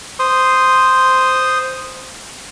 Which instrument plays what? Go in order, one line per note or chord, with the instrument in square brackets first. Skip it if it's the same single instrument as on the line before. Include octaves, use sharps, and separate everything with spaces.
[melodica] C5 C6 D#6